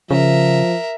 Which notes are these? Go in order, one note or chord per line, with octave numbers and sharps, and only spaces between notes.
C#3 F3 A#4 E5